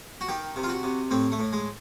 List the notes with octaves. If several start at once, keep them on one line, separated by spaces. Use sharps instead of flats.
F#4
D#3 G4
C3
F4
F#4
C3
A2 C4
A3
A2
G#3